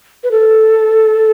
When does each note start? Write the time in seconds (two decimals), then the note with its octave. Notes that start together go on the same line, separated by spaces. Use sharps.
0.24 B4
0.31 A4